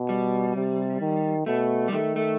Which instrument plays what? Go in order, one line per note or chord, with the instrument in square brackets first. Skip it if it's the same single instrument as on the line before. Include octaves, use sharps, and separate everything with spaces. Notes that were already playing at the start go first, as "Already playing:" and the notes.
Already playing: [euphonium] B2
[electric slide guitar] G3
[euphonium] C3
D#3
[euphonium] B2 [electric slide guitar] A3
[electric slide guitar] G3
[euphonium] D#3 [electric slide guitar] A3
[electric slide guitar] A3